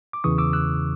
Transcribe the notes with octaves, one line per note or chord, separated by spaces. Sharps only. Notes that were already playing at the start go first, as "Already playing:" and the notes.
D6
E2 C#3 E3 C#6 D#6
D6 E6
E6 F#6